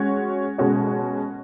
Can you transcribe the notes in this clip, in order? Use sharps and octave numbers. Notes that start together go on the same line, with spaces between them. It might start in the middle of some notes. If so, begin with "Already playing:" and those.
Already playing: G#3 C#4 F#4 C#5
B2 G#3 C#4 F#4 C#5